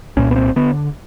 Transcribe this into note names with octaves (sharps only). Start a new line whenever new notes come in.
C2 A#2 C#4
B3
C4
D3 B3